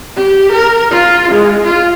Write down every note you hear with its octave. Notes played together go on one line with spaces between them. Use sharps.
G4
A#4
F4
G#3
F4